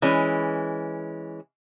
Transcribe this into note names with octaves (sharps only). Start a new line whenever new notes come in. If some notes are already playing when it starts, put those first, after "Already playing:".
E3 G#3 C#4